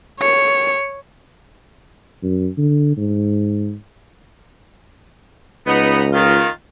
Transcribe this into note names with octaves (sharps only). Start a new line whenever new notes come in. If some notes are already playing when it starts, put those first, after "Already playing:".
C#5 C#7
F#2
D3
G#2
C#2 B3 D#4
D#3 F4